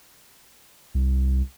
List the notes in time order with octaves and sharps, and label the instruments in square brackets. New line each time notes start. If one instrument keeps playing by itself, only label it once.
[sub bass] C2